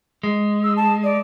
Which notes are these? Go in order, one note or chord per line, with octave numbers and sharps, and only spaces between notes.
G#3
E6
A5
D5